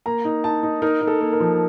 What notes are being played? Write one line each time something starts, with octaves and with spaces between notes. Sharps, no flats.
A#3 A#5
D#4
D#4 A5
D#4
D#4 A#4
D#4
A4
A#3
A#4
F3